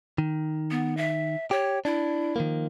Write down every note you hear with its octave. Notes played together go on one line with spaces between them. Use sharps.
D#3
B3
E5
G4 C#5
D4 E4
D#3 F3 A#3